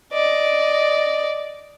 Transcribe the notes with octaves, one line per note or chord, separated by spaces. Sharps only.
D5 D#5